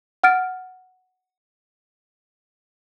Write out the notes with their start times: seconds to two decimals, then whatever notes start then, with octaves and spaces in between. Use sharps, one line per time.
0.24 F#5 F6 A6 D7